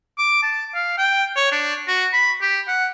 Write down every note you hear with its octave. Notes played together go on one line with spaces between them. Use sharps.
D6
A5
F5
G5
C#5
D4
F#4
B5
G4
F#5